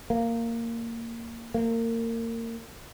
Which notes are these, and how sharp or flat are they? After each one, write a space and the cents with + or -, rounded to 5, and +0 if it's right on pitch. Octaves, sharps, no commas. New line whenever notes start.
A#3 -15
A#3 -30